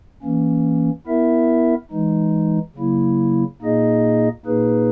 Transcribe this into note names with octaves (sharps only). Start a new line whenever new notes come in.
E3 A#3 C#4
B3 E4 A#4 E5
E3 G#3 D#4
C#3 F#3 A#3 E4
A#2 A#3 D#4 G#4 D#5
A#2 A#3 D#4 G#4 B4